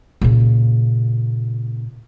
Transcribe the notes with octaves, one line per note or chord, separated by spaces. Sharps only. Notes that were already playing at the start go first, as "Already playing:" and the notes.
A#2 C#3